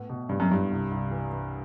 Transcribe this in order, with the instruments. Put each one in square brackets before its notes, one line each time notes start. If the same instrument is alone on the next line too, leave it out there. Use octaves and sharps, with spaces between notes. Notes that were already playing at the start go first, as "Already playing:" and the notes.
Already playing: [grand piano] A2 B3
B2
[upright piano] G2 [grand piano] B2
[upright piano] F#2
[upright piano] G2 [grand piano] E4
[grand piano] C2
C2
E3
E3